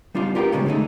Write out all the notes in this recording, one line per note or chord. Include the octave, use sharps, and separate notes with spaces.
G3 D4 D#4 F4
F4 G4 A#4 B4 G5
E2 G#2 C#3 G3 G#3
D3 G#3 A3 D#4